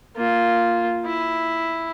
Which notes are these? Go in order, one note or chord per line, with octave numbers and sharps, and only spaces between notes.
A#3 F4
E4